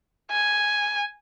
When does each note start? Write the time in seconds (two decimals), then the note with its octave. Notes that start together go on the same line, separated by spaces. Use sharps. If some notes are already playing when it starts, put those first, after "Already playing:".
0.31 G#5